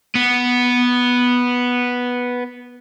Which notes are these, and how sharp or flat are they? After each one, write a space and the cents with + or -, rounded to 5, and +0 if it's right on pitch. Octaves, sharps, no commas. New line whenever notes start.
B3 -5